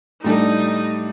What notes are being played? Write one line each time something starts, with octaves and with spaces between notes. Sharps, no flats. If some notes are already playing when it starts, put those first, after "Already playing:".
A2 G3 D4 D#4 A4